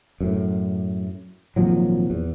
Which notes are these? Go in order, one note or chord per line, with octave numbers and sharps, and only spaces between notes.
F#2 A2
G#1 A#2 F3 F#3
E2